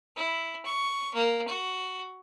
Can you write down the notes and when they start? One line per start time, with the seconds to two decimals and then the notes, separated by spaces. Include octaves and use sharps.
0.16 E4
0.65 C#6
1.14 A#3
1.48 F#4